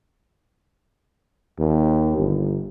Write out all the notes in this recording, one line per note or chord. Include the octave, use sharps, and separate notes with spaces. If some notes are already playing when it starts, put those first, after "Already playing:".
D#2
G1